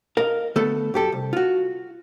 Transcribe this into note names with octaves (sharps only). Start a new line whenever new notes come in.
A#4 D#5 F5
D3 A3 B3 A4
F#2 G4 A4
C2
F4 F#4